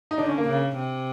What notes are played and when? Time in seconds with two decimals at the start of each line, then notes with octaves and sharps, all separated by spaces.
0.11 D#4
0.18 D3 D4
0.28 C#4
0.38 A#3
0.48 C#3
0.76 C3